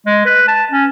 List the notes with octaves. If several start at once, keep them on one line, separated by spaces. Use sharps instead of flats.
G#3
B4
A5
C#4